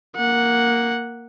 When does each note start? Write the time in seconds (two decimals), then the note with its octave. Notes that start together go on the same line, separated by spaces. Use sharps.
0.16 A#3 F#5